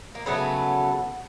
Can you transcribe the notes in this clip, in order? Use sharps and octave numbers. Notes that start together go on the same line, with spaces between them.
A#3
C#3 F#3 A3 B3